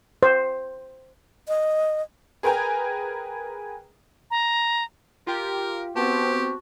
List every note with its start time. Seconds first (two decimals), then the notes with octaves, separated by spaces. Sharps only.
0.23 C5
1.48 D#5
2.43 G#4 A#4 B4 G5 G#5 A#5
4.31 A#5
5.27 F4 G4 A#4
5.96 B3 C4 F#4 G4 A5